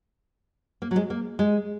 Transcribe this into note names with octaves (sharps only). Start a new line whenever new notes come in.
A#3
F#3
G#3
A#3
G#3